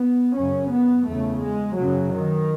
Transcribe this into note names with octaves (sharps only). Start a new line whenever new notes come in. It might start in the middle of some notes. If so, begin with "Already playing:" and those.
Already playing: B3
F#2 C#3 C#4
B3
E2 C#3 A3
G#3
F#2 C#3 F#3
D#3